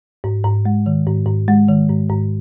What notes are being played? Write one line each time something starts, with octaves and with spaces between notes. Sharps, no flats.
G#2
G#2
G#3
D#3
G#2
G#2
G#3
D#3
G#2
G#2